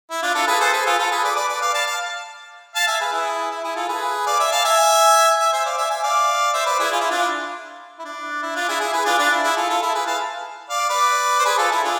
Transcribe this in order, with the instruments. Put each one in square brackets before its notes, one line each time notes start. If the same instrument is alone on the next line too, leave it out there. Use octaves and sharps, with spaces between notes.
[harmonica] E4
D4 F4
F4 A4
G#4 B4
A4 C5
G#4 B4
F4 A4
F4 A4
G#4 B4
B4 D5
B4 D5
B4 D5
D5 F5
F5 A5
F5 A5
F5 A5
E5 G#5
G#4 B4
E4 G#4
E4
E4 G#4
F4 A4
G#4 B4
D5 F5
E5 G#5
F5 A5
E5 G#5
E5 G#5
C5 E5
D5 F5
E5 G#5
E5 G#5
D5 F5
C5 E5
B4 D5
E4 G#4
F4
E4
D4 F4
E4
D4
E4
D4 F4
E4 G#4
E4 G#4
G#4 B4
D4 F4
D4 F4
E4
E4 G#4
F4 A4
F4 A4
E4 G#4
G#4 B4
F5 A5
D5 F5
B4 D5
C5
G#4 B4
F4 A4
E4 G#4
D4 F4